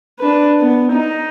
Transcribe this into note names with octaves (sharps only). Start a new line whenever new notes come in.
D4 B4
B3
D#4